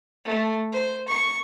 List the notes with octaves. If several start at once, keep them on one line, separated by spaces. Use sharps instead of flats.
A3
C5
C#6